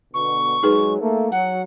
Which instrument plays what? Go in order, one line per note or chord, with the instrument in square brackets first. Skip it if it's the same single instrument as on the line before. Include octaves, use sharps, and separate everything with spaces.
[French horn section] B2 D3 [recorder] C#6
[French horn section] F#3 G#3 [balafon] D#4 G#4 B4
[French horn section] A3 A#3
[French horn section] F#3 [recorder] F#5